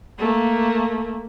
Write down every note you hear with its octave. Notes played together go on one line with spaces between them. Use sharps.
A3 A#3